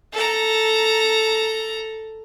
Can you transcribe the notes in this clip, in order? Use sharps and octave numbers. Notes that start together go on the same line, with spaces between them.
A4 A#5